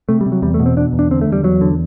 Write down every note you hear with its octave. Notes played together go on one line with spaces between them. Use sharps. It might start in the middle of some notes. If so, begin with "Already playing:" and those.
C3 A3
G3
C3
F#3
E2 G3
A3
B2
C4
B2 D4
E2
D4
D3 C4
A3
E2
G3
E2 F#3
D3